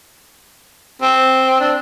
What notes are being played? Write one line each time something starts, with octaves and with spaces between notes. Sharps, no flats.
C4
D4